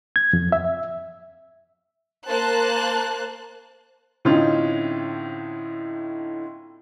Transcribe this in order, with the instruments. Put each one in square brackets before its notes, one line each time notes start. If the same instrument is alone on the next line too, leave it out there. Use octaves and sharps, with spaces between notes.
[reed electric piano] G#6
F2
E5
[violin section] A#3 A#4 C5 A5 F#6
[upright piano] A2 D3 C4 C#4 D#4 F4